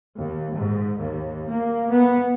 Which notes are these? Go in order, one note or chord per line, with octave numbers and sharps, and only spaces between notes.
D#2
G#2
D#2
A#3
B3